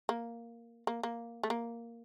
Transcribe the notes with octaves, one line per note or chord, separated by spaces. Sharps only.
A#3
A#3
A#3
A3
A#3